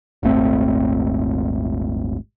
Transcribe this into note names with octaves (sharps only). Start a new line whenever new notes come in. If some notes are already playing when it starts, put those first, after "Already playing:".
D#1 G#1 A3 C4